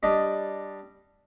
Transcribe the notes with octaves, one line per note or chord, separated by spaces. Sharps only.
G3 D4 D#5